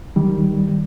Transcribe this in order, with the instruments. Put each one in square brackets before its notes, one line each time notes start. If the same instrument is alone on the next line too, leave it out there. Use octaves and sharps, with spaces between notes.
[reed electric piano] D#3 G3